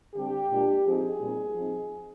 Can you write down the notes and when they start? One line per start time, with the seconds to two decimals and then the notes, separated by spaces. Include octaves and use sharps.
0.15 D3 G3 C4 G4
0.50 A#2 G#3 D4
0.85 F3 C4 D#4 G#4
1.19 A#2 G3 C4 D#4
1.54 F3 C4 D#4